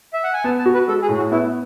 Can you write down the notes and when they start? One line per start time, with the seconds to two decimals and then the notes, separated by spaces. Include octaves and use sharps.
0.13 E5
0.23 F#5
0.33 G#5
0.44 B3 A5
0.59 A5
0.66 F#4
0.74 B4
0.88 G#3 A4
1.02 G#4
1.09 A2
1.17 F#4
1.31 B3 E4